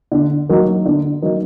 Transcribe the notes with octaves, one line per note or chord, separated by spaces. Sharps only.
D3
F#3 A#3 D#4
D3
F#3 A#3 D#4